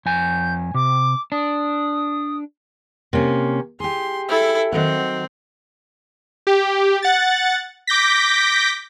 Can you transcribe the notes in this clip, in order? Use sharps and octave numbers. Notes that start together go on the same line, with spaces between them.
F2 G#5 G6
C3 D6
D4 D#6
C3 A#3 C#4
G4 G#4 C6
E4 A4
D#3 F#3 C4 F#5
G4
F#5 A6
D6 G6 A#6 B6